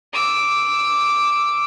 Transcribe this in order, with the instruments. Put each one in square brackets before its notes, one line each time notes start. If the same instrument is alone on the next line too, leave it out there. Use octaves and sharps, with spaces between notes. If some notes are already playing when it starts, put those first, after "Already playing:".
[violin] D6 E6